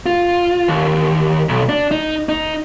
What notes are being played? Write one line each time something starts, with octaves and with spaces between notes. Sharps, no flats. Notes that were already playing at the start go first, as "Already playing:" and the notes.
F4
D#2
B1
D4
D#4
D#4